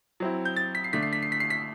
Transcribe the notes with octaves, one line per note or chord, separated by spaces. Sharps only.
F#3 C4 E4
G6
A6
B6
C7
D3 A3 D4 B6
C7
B6
C7
B6
C7
B6